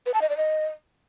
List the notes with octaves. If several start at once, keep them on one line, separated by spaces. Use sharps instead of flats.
B4
A5
D#5
D5
D#5